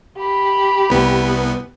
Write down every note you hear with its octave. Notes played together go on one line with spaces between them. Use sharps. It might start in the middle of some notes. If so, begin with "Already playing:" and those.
G4 B5
C2 B3